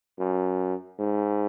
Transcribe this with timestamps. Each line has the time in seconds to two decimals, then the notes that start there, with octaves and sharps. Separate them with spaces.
0.19 F#2
0.99 G#2